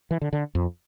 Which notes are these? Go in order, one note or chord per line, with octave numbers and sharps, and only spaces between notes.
E3
D3
D3
F2